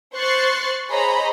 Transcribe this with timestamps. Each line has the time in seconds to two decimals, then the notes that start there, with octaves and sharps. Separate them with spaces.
0.15 C5 C#6 F#6 A6 C7
0.90 G#4 C5 C#5 D#5 A#5 B5